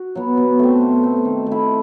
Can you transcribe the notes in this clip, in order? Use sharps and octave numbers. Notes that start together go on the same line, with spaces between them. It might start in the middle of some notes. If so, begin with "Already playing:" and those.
Already playing: F#4
F#3 B3
B2
A3 C4
B2
A3 C4
D#3
A3
E4